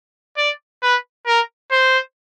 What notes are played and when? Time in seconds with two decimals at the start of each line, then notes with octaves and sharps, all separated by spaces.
0.37 D5
0.82 B4
1.27 A#4
1.71 C5